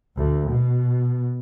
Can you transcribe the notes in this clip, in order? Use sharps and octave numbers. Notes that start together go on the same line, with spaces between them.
D2
B2